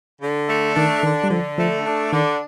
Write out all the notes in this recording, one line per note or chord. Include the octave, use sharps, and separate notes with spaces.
D3
A3
D#3 D4
D3 D#3
G3
D3 F3
F3 A3
D4
D3 D#3